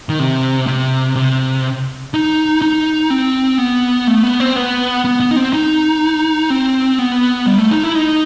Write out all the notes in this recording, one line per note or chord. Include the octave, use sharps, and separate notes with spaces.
D#3
C3
C3
C3
D#4
D#4
C4
B3
A3
B3
C4
B3
B3
B3
D#4
C4
D#4
C4
B3
G3
A3
D#4
E4
D#4